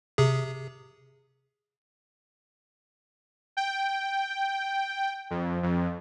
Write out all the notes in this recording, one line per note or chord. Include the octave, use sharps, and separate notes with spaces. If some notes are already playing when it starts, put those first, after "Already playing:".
C3 G#4
G5
F2
F2